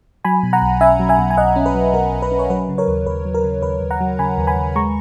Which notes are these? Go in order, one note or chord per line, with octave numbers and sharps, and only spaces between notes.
F#3 G#5 B5
B2
F#5 A#5
B1
C#4 E5 G#5
F#3
E5 G#5
B2
G#5
B1 D#5 F#5
C#4
B4
F#3
B2 A#4
B1
B4
C#4
C#5
F#3 B4
C#3
A#4 C#5
D#2
D#2 B4
F#3
A#4
C#3
D#2 B4
D#2
F#5 A#5
F#3
C#3 G#5 B5
D#2
G#5 B5
D#2
G#3 A#5 C#6